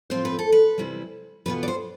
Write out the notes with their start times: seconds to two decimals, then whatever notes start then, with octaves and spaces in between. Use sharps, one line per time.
0.10 A2 F3 C4 F4 C5
0.25 B4
0.39 A4
0.52 B4
0.78 E2 C3 G3 C4 E4
1.46 E2 B2 B3 F4 B4
1.63 D5
1.68 C5